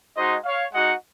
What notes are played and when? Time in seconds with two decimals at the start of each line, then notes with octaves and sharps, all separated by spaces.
0.17 G#3 D#4 F#4 C5 D#5
0.45 C#5 F5
0.73 G#3 D#4 F#4 D#5 F#5